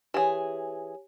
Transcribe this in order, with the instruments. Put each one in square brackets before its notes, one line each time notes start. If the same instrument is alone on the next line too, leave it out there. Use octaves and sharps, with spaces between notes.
[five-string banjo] E3 G#4 [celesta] G4 C#5 G#5